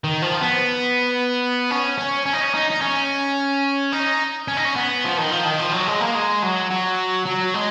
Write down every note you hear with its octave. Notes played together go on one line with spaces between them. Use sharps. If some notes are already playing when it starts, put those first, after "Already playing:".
D#3
F3
B3
C#4
C#4
C#4
D#4
C#4
D#4
D#4
C#4
D#4
C#4
D#4
C#4
B3
F3
D#3
F3
D#3
F3
F#3
G#3
A#3
G#3
F#3
F#3
F#3
G#3